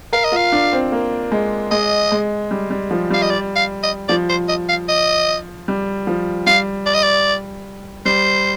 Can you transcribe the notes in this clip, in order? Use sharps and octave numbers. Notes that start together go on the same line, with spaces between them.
A#4 F5
D#5
F4 F5
D4
C4
A#3
G#3
G#3 D#5
G#3
G3
G3
F3
G3 F5
D#5
D5
F5
D#5
F3 D5
C5
D#5
F5
D#5
G3
F3
G3 F5
D5
D#5
D5
G3 C5